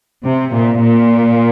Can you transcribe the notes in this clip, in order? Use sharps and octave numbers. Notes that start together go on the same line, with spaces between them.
C3
A#2
A#2